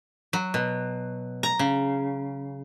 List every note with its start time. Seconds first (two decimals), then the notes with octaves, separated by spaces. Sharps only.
0.33 F#3
0.54 B2
1.43 A#5
1.59 C#3